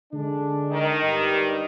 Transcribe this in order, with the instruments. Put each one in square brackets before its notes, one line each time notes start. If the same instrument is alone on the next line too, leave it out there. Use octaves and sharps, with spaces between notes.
[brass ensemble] D3 G#3 D4
[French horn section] D#3
[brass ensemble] G2 G3